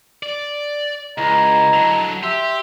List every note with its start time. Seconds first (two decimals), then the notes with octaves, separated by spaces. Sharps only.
0.23 D5
1.18 C#2 E4 D#5 A#5
1.74 D3 F#3
2.23 G4 E5 C6 E6